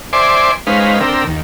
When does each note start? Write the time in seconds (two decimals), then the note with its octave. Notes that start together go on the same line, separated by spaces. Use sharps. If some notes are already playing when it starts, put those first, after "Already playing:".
0.13 C5 D5 E5 G#5 C6 D6
0.67 G#3 C#4 D#4 B4 C5 F5
1.00 D3 C4 A#4 G5 E6
1.27 D#2